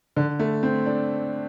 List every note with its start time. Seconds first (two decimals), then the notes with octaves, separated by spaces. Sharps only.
0.17 D3
0.39 A3
0.63 C4
0.86 D4